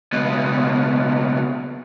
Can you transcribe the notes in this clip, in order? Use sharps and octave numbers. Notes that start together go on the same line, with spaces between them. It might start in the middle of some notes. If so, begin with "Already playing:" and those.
C#2 B2